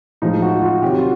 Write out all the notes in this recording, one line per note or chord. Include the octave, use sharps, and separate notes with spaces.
A2 F3 G#3 D#4
F#4
F4
C3 D#3 F#3 G4
F#4
F4